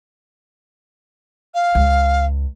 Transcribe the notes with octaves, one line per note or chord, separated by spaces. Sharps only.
F5
C#2